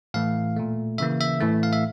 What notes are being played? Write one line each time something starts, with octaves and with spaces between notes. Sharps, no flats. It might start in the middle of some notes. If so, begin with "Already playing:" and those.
A2 E3 A3 F5
A#2 A3
C#3 E3 A#3 E5
E5
A2 E3 A3
F5
E5